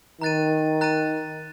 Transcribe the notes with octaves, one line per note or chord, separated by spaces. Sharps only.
D#3 A#5 F#6 A6 D#7
A#5 F#6 A6 D#7